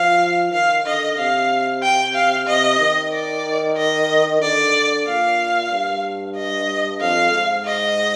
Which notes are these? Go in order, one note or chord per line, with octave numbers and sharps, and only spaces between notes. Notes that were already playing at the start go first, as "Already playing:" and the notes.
Already playing: F3 F5
D#3 F5
D3 D#5
C3 F5
G5
F5
C3 D#5
D#3
D5
D#5
D3 D5
A#2 F5
G2
D#5
F2 F5
G#2
D#5